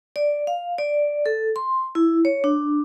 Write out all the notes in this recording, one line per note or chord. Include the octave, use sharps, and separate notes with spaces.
D5
F5
D5
A4
C6
E4
C#5
D4